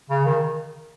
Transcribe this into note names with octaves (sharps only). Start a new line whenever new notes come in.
C#3
D#3